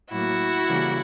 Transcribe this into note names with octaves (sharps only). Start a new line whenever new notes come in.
A2 F#3 A#3 E4 F#4
C#3 E3 G3 A#3